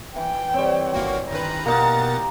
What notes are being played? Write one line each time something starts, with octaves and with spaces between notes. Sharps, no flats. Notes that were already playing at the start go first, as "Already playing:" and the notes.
E3 G5
G3 C4 C#5
G#1 A#3 F#4
G1 D#3 B4 A#5
B2 A#3 D#4 G4 A#4 F#5 A6